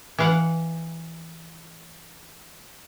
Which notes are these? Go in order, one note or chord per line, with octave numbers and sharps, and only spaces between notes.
E3 F5 F#5